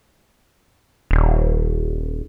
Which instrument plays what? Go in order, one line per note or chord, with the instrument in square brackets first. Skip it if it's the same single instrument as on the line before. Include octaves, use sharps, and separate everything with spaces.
[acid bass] D#1